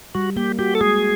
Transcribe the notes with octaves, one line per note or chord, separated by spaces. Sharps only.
G3 F#4
A#3 G4
F#4 G4
A4
G#3 G#4